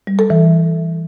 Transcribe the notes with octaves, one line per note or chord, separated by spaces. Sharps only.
G3
A4
E3